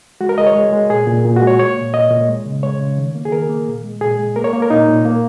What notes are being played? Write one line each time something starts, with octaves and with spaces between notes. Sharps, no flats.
G#3 F#4
A#4
G#3 D#5
C#5
G#3
G#3
A#2 G#4
A#2
A#2
F#4
G#3
C#5
A#3 C#5
A#2
A#2 D#5
A#2
G#3
C#3
G#3 C#5
C#3
D#3
A#3
G#4
D#3 A#4
A#3
A#2
G#3
A#2 G#4
G#3
A#3 A#4
C#5
A#3
A#4
A#2 D#4
A#2
A#3